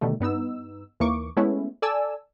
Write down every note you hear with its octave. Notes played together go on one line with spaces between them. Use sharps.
B2 D3 D#3 G3 A3
G2 B3 D#4 E6
D#2 E3 A#3 C#6 D6
G#3 A3 B3 C#4 E4
A4 D5 G#5 A5 E6